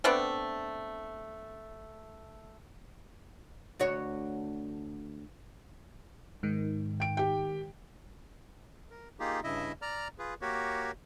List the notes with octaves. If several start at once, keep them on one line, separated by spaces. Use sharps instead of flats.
A3 B3 C4 D4
D2 F#4 C#5
G#2 D#3
G5 D7
G4 G5
A#4
A#3 D#4 F4 G4 G#4
G2 C#3 E4 D#5 E5
D5 A#5 F6
F4 G#4 B4
A#3 F#4 G4 A#4 C#5